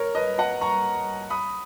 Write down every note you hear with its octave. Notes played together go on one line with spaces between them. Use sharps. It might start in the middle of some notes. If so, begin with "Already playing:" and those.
Already playing: A#4 C#5
B4 D#5
D#5 F#5
A#5 C#6
B5 D#6